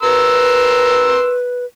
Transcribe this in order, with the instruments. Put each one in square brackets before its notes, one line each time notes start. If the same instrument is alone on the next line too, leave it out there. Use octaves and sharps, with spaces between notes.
[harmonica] A#4 C6 E6 [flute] B4